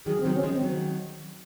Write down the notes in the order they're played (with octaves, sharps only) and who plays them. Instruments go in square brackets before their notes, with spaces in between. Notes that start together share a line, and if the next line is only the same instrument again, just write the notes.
[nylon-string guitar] D#3 F#3 [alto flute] G#4
[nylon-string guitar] D#3 F#3 [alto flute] C4
[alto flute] C#4
[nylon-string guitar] F3 G#3
[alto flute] C4
[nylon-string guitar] D#3 F#3